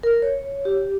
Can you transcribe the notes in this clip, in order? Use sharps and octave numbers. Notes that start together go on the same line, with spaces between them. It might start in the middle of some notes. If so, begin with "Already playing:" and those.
A#4
C#5
G4